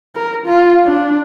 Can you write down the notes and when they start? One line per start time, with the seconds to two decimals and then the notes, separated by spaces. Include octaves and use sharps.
0.16 A#4
0.46 F4
0.85 D4